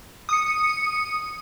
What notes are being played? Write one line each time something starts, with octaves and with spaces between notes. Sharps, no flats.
D#6 C#7